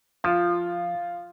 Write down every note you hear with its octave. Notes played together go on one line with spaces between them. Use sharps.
F3 F4